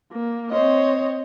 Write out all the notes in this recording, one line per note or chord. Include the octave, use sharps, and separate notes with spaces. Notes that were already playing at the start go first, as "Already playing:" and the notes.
A#3
C4 C5 C#5 D#5